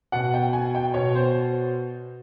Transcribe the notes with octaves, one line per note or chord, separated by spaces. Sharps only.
B2 F#5
G5
G#5
G5
B2 C#5
C5